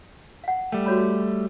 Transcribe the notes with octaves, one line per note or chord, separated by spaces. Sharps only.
F5 F#5
G3 A3 G5
F#4 C#5 B5